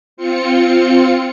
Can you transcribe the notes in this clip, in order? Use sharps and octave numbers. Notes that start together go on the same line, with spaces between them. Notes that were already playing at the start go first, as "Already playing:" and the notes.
C4 F4 C#7